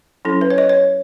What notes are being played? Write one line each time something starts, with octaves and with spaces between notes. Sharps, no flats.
F#3 C#4 E4 A4
B4
C#5
D#5
C#5